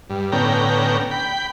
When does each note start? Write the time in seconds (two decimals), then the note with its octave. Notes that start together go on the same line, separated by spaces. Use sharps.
0.10 G2
0.32 A2 D3 B3 C#4 G5 A#5
1.11 G5 B5